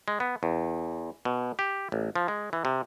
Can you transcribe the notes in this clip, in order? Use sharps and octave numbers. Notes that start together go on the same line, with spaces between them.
G#3
B3
E2
B2
G4
A1
F3
G#3
E3
C3